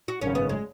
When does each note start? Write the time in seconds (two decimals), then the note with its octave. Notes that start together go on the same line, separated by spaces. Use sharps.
0.08 F#4
0.21 G#1 F#2 C#3 C#4
0.35 B3
0.49 G#3